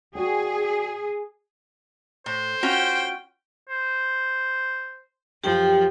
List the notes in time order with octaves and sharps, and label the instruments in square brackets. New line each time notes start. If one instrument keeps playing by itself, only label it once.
[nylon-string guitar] F#4 D5 G5 [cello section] G#4
[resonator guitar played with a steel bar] A2 [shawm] C5
[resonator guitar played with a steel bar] C#4 F4 F#4 [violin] G5
[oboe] C5
[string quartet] F#2 F3 [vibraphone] G4 G5